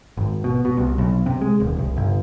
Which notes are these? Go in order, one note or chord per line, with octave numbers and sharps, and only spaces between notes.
G#1
B2
B2
C2
B1
C3
G#3
D#1
C2
G1